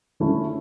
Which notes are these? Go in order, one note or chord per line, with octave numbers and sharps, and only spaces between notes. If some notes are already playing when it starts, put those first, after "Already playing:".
D3 A3 C#4 E4 A4